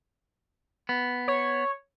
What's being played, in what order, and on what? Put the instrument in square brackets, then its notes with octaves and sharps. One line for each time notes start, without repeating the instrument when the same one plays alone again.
[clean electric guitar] B3
[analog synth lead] C#5